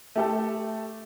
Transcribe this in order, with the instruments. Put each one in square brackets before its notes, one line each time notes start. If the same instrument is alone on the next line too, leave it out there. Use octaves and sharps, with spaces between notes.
[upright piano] A3 G4 A4